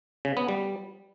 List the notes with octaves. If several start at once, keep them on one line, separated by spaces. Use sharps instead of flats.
C#3
B3
G3